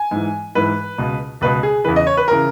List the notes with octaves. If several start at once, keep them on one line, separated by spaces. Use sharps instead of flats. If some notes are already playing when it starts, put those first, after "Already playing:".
Already playing: G#5
G#2 E3
G#2 E3 B4
C#2 B2
C#2 B2 B4
G#4
E2 C#3 E3 B4
D#5
C#5
B4
C#3 E3 A#4